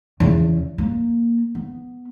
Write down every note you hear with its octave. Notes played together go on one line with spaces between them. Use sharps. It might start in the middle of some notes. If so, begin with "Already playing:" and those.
E2 C#3
A#3
B3